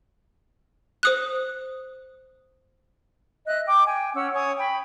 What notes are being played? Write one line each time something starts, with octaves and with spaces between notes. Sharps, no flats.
C5 D#6 F#6
D#5 E5 F#6
G5 D6
G5 G#5
C#4 F#5 E6
C#5 G#5 C#6 D#6
G5 B5